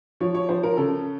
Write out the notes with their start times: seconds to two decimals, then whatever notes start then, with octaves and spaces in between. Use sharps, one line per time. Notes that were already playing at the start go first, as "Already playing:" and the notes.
0.20 F3 C#5
0.34 C#5
0.49 F3 C5
0.63 A#4
0.77 C#3 A4